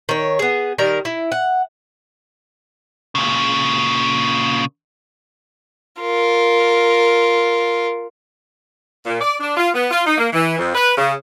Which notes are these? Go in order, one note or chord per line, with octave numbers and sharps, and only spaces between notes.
D#3 C#5
B3 G#4
D#3 G3 A#4 A#5
E4
F#5
A#2 C#3
F4 A#4
A#2
D5
D4
F4
B3
F4
D#4
A#3
E3
F2
B4
C#3